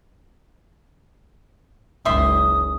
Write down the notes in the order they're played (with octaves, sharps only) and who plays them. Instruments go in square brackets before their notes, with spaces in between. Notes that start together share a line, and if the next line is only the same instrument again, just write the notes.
[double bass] F#1 C#2 [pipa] D#3 E5 C6 [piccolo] D#6